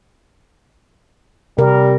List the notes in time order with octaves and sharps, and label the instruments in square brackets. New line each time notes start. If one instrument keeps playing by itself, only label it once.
[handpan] C3 A#4 [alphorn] G3